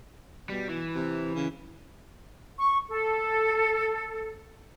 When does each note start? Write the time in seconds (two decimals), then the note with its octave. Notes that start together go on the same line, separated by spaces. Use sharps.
0.49 B2 G3
0.69 E3
0.95 C3
1.35 C#3
2.58 C#6
2.90 A4